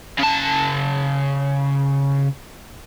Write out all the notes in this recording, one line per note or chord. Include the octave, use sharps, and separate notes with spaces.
C#3 A5